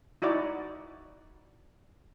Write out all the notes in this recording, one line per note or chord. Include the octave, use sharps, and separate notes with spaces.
D#4 E4 F#4 D5